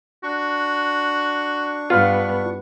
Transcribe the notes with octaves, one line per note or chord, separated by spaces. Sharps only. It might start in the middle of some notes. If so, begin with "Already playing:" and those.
D4 F#4 C#6
G2 B3 F4